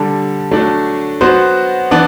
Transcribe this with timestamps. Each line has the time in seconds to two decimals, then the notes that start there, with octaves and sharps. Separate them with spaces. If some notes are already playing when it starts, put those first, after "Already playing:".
Already playing: D3 G3 D4 A4
0.51 F#3 A3 D4
1.21 F#3 B3 F#4 C5
1.91 E3 B3 D4